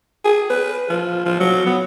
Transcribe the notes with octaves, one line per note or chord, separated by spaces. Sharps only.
G#4
B4
F3
F3
F#3
B3